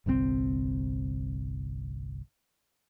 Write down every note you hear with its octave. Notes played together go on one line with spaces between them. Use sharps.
G1 C2 C3 C4